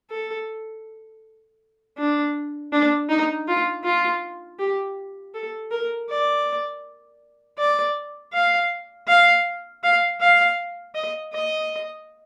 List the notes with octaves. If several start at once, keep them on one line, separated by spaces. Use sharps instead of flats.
A4
D4
D4
D#4
F4
F4
G4
A4
A#4
D5
D5
F5
F5
F5
F5
D#5
D#5